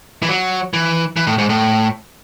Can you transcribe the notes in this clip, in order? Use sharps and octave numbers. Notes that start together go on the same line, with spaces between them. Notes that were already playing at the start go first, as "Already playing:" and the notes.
E3
F#3
E3
E3
A2
G#2
A2